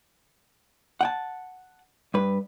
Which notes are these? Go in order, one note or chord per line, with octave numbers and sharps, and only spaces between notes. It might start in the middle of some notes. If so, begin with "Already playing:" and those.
F#5 G5 A5
G2 B4